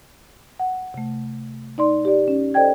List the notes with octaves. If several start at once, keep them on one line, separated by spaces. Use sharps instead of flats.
F#5
C3 A3
D#4 D5 C6
G4 D5
C#4
A4 C5 D5 D#5 G5 G#6